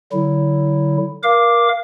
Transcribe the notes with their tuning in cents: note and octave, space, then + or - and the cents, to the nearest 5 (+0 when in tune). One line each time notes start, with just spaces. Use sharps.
D3 +0 F#3 +35 E4 +0
A#4 +25 F5 -15 D6 +0